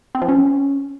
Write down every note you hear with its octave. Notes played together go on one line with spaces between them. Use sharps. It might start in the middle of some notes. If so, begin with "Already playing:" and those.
C4
F3
C#4